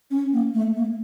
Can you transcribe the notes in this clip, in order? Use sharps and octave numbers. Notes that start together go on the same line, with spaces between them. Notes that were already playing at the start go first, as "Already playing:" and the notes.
C#4
A#3
A3
A#3